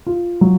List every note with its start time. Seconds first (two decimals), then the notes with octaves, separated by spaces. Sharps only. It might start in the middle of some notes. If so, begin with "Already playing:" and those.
0.07 F4
0.41 F#3